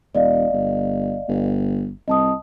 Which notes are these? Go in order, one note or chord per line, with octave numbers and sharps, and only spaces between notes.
E1 D5 D#5 F5
G1
G1
C2 D#5 A5 D#6